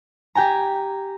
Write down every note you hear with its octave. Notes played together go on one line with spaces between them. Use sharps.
G4 G5 G#5 A#5